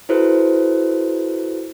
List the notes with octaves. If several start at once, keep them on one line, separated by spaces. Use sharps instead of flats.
E4 F#4 A4 B4 C5